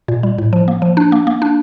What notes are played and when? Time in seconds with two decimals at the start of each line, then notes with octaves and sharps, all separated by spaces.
0.08 A#2
0.23 G3
0.38 A2
0.53 F3
0.68 A#3
0.82 F3
0.97 D4
1.12 A#3
1.27 A#3
1.42 D4